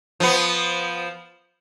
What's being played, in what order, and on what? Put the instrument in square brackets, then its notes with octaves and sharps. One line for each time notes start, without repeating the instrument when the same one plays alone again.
[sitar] F3 B3